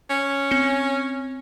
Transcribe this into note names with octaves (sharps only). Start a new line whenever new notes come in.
C#4
C4 C#7